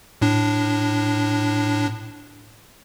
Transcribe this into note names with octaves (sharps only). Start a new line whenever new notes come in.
A2 D4